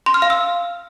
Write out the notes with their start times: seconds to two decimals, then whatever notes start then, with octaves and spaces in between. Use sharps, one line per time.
0.06 C6
0.14 F6
0.22 F5
0.30 E6